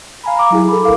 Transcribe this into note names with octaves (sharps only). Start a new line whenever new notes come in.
F5 G#5 A#5 B5
A#5 D6
F#3 E4 G#4
A4 B5
A#1 A#4 F5 D6